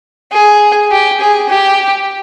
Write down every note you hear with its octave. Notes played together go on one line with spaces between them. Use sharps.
G#4
G4
G#4
G4